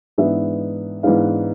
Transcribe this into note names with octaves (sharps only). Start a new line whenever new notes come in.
G#2 E3 G#3 B3 D4 E5
G#2 E3 G#3 B3 D4 F5